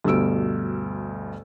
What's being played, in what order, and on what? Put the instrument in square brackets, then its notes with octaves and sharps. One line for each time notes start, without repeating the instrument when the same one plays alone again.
[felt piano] D2 G2 B2 E6 D7